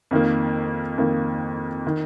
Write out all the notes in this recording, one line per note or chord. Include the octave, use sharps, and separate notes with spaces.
F2 D#3 A#3
F2 D#3 A#3
D#3